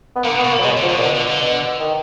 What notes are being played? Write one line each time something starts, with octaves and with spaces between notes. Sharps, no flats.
B3
D3 A#3
B3
B2
A#3
F#3
B2 G#3
D3
F3
B2
A#2
B2 D3
D3
D3
B2
D#3